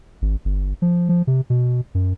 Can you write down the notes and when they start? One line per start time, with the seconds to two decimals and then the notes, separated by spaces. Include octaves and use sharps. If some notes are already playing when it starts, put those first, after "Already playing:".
0.22 G#1
0.45 G1
0.82 F3
1.09 F3
1.27 C3
1.50 B2
1.95 F#2